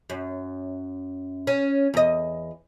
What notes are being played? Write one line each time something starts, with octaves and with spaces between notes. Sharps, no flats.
F#2
C#4
E2 D#5